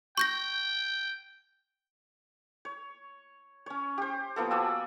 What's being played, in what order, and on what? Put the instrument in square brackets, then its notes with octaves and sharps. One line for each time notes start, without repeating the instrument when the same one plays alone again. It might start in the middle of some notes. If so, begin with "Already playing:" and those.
[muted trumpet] G5 [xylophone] C#6 G6 A#6
[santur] C#5
C#4 C#5
G4 C5
F3 A#3 B3 A4
F#4 D5 G#5 E6